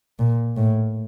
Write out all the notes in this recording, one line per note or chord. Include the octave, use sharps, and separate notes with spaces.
A#2
A2